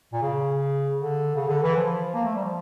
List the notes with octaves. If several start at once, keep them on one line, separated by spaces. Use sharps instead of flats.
A#2
C#3
D3
C#3
D3
E3
F3
A#3
A3
G3
F3